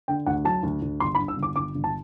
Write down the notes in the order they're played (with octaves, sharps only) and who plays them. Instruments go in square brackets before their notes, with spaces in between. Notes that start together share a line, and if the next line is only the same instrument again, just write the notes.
[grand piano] D3 G5
D2 F#5
F#3 A5
D2
D2
G1 C6
B5
G2
E6
G1
D6
G1 D6
G1
A5